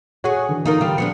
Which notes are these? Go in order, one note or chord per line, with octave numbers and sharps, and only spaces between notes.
F#4 G#4 C#5 F#5 C#6
D3 E3
D#4 F4 A#4
G3 F4 G4
F3 B3 D4 C#7